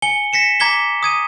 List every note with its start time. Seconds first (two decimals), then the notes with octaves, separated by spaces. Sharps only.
0.02 G#5 C#7 G7
0.33 A#6 B6 C#7 E7
0.60 A#5 D6 G#6 B6 G7
1.03 D#6 G#6 D#7